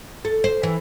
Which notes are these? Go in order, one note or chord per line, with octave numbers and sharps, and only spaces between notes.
A4
C5
E3